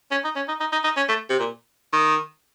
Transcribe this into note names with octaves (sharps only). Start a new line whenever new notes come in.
C#4
D#4
C#4
D#4
D#4
D#4
D#4
C#4
A3
C3
A#2
D#3